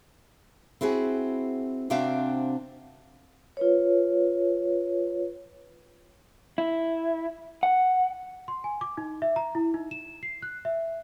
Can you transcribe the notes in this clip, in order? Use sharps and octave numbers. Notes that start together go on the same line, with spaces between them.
C4 E4 F#4 G#4
C3 C4 D4 F#4 E5 F5
F4 B4 C#5
E4
F#5
C6
G#5
D6
D#4
E5
A#5
E4
D#4
E7
C7
F#6
E5